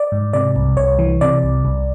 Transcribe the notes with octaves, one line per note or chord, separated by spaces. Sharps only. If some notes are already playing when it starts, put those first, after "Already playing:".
Already playing: D5
G#2
C3 D5
C2
C2 C#5
E3
C3 D5
C2
C2